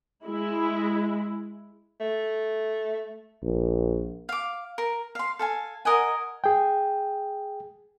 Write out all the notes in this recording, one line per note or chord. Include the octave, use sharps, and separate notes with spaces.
G#3 E4
A3
A#1
F5 D6
A#4
F5 C6
A4 F5 G#5
A#4 D#5 F#5 G#5
G#4 G5